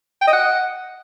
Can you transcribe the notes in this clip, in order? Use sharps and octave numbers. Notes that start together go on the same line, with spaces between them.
G5
D#5
F#5